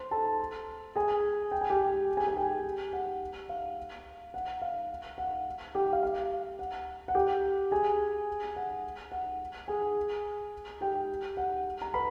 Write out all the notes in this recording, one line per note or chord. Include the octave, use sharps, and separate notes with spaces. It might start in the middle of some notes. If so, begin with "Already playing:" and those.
Already playing: C5 C6
A4 A5
G#4 G#5
G5
G#5
G4 G5
G#4 G#5
G#4 G#5
G4 G5
F#5
F5
F#5
F5
F#5
G4 G5
F5
F5
F#5
F#5
G4 G5
G#4 G#5
F#5
F#5
G#4 G#5
G4 G5
F#5
A#5
B4 B5